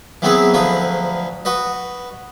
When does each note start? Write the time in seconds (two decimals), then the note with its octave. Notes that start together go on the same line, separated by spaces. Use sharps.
0.22 E3 F#3 B3 C4 G#4 B4
0.54 D2 F3 F#3 B4 D#6
1.45 F#4 B4 D#5